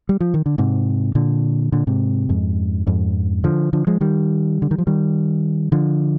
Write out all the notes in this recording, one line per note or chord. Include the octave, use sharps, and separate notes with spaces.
G3
F3
D#3
D3
G#2 C3
A#2 D3
A#2 D3
G#2 C3
F2 G#2
F2 G#2
D3 F3
D3 F3
F3 G#3
D#3 G3
D3
D#3
F3
D#3 G3
D3 F3